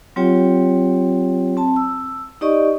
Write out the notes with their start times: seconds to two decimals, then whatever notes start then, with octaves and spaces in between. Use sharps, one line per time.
0.16 F#3 C4 F4 G4 C#5 G5
1.57 C4 A5
1.76 E6
2.41 D#4 G4 D5 D#5 C#6